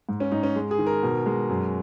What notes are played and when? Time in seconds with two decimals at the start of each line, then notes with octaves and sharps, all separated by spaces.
0.09 G#2
0.20 C#4
0.32 G#2 D#4
0.43 C#4
0.56 G#3
0.71 G#4
0.79 D#3
0.86 A#4
1.03 B2
1.26 G#3
1.49 F#2